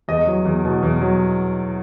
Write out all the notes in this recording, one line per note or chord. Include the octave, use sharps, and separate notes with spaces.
E2 D#5
F#3
E2
B2
E2
F#3